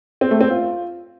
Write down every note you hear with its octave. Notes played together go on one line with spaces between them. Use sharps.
C4
A3
C4
F4